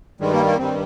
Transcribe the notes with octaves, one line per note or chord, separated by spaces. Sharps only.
G2 D#3 G3 G#3
A#3
A#3
G2 D#3 G3 C4